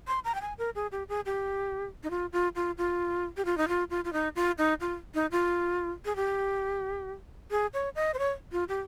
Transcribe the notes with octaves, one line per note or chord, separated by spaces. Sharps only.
C6
A#5
G5
G#5
A#4
G#4
G4
G#4
G4
D#4
F4
F4
F4
F4
G4
F4
D#4
F4
F4
F4
D#4
F4
D#4
F4
D#4
F4
G#4
G4
G#4
C#5
D#5
C5
C#5
F4
G4